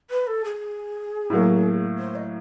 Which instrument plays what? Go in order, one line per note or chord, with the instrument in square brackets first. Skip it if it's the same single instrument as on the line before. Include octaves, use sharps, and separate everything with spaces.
[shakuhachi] B4
A4
G#4
[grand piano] A2 F#3 A#3
[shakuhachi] C5
D#5